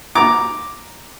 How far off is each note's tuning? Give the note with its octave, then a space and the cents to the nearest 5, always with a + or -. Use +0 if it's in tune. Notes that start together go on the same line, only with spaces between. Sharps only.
A#5 +0 D6 +0